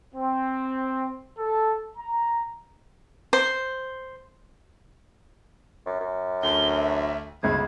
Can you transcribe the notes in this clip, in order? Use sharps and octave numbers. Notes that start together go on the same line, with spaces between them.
C4
A4
A#5
C5
F#2
F#2
D2 G7
E5
G1 C#2 F#2 B2 F3 G#6